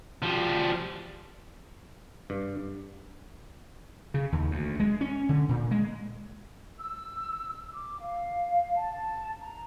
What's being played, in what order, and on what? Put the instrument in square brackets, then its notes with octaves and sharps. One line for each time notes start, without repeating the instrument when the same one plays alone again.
[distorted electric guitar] F3 G3
[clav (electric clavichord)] G2
[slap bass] C#3
D#2
D2
G#3
C#4
D3
A#2
G#3
[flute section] E6
D6
F5
A5
A#5